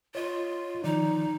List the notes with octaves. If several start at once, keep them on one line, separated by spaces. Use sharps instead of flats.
F4 C#5 D#5
D#3 F3 D#4 D5